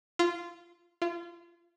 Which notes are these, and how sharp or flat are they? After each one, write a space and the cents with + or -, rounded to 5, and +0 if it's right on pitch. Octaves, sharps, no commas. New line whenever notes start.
F4 -15
F4 -30